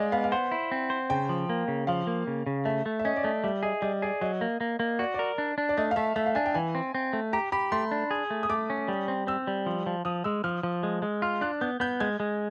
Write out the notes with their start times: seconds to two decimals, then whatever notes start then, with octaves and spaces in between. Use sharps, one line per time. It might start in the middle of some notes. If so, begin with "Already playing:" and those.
Already playing: G#3 D5 D#5 F5
0.12 B3 F5
0.24 F5
0.32 C5 F#5
0.51 E4
0.72 C4
0.90 C5
1.10 C#3 G5
1.29 F3
1.49 A#3
1.68 C#3
1.87 F3 F5
2.07 A#3
2.27 C#3
2.46 C#3
2.65 A3 E5
2.86 A3
2.99 E5
3.05 C#4 D#5
3.16 D5
3.23 A3 D#5
3.44 G3 E5
3.63 G#4 D#5
3.82 G3 D#5
4.02 G#4 D5
4.21 F#3 D#5
4.41 A#3
4.61 A#3
4.80 A#3
4.99 F#4 D5
5.14 A#4 D5
5.38 D4
5.58 D4
5.69 D5
5.77 A3 D#5
5.91 F5
5.96 A3 E5
6.16 A3 E5
6.26 F5
6.35 D4 G#5
6.46 G5
6.54 E3 G#5
6.75 C4
6.95 C4
7.13 A3
7.33 G4 A#5
7.52 G4 B5
7.72 A3 C6
7.91 D4
8.11 G#4
8.30 A3
8.43 D#6
8.49 A3 D6
8.70 C#4
8.88 G3
9.08 C4
9.27 C4 E6
9.47 G3
9.66 F3
9.86 F3
10.05 F3 D#6
10.24 G#3 E6
10.44 F3 F6
10.63 F3
10.83 G#3
11.02 G#3
11.22 F4 F6
11.41 D4 F#6
11.61 B3 G6
11.80 B3 G6
12.00 G#3 G#6
12.20 G#3